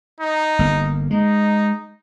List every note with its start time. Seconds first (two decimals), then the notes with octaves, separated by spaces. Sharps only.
0.20 D#4
0.59 G1 A#3
1.11 G#3 D#4